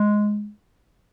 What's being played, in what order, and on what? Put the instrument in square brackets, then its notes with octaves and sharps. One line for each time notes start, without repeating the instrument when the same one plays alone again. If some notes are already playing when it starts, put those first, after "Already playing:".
Already playing: [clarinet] G#3